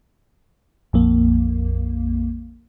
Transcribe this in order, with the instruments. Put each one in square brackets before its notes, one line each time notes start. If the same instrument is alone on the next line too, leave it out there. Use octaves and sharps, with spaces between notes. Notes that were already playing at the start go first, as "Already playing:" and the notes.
[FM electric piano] A#1 F2 A#3